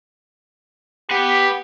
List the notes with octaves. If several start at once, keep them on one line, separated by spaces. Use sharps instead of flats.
G4 B4 F#5